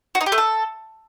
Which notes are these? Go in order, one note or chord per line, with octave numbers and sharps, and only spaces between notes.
F#4
D#4
G4
A3
A4